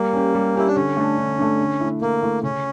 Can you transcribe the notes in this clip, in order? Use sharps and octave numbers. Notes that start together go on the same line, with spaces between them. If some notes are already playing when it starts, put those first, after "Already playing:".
Already playing: G3 A#3
C#4 G4
G3
C#4 E4 G4
D4
D3 C#4
A3 D4
D3
A3 D4
D3
A3 E4
D3 A#3
A3 E4
C#3 C#4